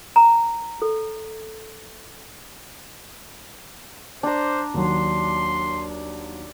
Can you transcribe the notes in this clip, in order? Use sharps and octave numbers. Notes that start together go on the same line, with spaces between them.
A#5
A4
D4 C5 A#5
D#2 F#3 C6